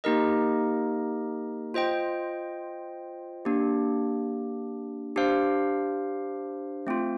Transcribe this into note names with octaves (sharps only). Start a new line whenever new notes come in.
A#3 D#4 G4 A#4 D#5
F4 C5 D#5 G5
A#3 D4 G4
D4 G4 C5 F5
A3 C4 F4